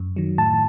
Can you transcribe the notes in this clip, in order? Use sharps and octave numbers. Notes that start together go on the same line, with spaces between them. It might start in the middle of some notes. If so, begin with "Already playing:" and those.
Already playing: F#2
D#3 F#3
A2 A5